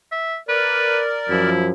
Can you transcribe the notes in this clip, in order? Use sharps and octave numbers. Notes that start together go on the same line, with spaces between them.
E5
A#4 B4 D5
F#2 F3 E4